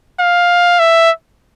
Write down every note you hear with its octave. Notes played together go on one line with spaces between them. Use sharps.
F5
E5